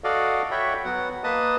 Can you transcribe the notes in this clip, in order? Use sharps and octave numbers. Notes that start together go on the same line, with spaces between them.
F#4 A4 D5 D#5 F5
F#4 C#5 E5 G5 B5
F#3 B3 F#4 F#5
A#3 B4 D#5 A5 D#6